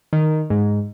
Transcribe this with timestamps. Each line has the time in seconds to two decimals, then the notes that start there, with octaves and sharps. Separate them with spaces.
0.13 D#3
0.50 G#2